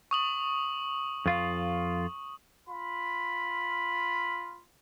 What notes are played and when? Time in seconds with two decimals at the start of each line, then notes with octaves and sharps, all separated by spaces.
0.11 C#6 D#6 F#7
1.26 F2 F4 F5
2.69 F4 B5